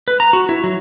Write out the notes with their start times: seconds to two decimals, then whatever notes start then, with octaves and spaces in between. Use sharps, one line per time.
0.08 B4
0.20 A#5
0.33 F#4
0.49 E4
0.64 F#3